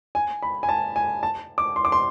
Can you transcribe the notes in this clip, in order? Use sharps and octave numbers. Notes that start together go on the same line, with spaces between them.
G#5
B5
G#5
A5
G#5
A5
D6
C6
D6
C6